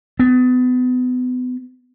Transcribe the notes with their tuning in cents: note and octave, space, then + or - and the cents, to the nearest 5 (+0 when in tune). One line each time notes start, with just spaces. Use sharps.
B3 +30